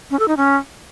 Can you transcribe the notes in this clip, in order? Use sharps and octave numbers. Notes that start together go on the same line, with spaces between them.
C#4
A4
D#4
C#4